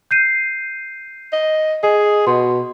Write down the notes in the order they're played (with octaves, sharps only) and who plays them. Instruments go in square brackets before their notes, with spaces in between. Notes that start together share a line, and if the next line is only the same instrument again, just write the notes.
[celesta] G6 C7 D#7
[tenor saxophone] D#5
[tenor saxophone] G#4 [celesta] D#5
[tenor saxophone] B2 [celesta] C6